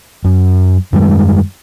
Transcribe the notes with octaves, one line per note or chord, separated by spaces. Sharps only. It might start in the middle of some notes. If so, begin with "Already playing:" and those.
F#2
F#2 D#3 G3 G#3